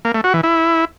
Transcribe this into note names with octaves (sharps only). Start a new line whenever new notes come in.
A#3
A3
F#4
E3
E4